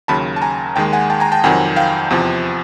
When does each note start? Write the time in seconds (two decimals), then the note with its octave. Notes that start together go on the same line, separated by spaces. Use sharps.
0.08 D#2 C#3 F#3 A5 B5
0.36 A5
0.42 G#5 A#5
0.76 D#2 D#3 G#3 G5 A5
0.93 F#5 G#5
1.10 G5 A5
1.20 G#5 A#5
1.32 G5 A5
1.44 F2 C3 D#3 F#3 F#5 G#5
1.76 F5 G5
2.10 E2 C3 F3